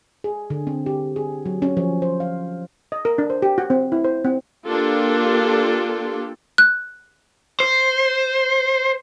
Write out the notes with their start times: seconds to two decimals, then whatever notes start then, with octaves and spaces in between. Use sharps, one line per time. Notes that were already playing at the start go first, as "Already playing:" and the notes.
0.24 G#4
0.50 D3
0.67 C4
0.86 G4
1.16 G#4
1.46 F#3
1.62 C#4
1.77 F3
2.02 C5
2.20 F5
2.92 D#5
3.05 A#4
3.18 D4
3.30 C5
3.42 G4
3.58 F#4
3.70 C4
3.92 E4
4.04 C5
4.25 C4
4.67 A#3 D4 F4 G4 A4
6.58 F#6
7.60 C5